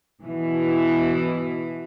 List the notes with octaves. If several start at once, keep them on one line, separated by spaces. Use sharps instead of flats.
B2 E3